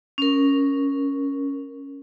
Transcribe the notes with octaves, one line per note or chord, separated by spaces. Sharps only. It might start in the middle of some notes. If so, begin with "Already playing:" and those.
C#4 A#4